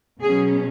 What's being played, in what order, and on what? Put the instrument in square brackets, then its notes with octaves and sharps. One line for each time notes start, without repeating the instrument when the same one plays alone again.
[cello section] B2 F#3 C#4 G#4